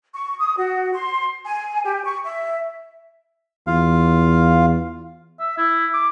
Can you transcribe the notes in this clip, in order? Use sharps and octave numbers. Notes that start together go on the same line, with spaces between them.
C#6
D#6
F#4
C6
G#5
G4
C#6
E5
E2 F4 F5
E5
E4
D6